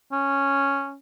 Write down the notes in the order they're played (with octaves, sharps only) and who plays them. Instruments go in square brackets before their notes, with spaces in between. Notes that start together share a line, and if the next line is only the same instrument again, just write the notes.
[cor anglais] C#4